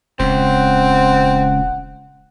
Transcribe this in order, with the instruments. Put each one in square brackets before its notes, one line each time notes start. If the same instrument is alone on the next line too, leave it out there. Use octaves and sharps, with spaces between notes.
[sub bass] D#1 [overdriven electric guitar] C#2 [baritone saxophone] C4 [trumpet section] F#5